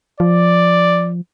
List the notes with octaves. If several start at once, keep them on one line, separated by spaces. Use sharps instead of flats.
F3 D5